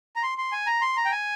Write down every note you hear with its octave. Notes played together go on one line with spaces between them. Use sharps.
A#5
C6
C6
G#5
A#5
C6
A#5
G5
G#5